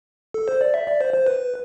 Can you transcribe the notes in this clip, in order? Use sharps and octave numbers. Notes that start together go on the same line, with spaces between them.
A4
C5
D5
E5
D5
C5
C5
B4